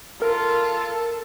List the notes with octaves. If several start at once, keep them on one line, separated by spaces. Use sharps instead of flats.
F4 A4 A#4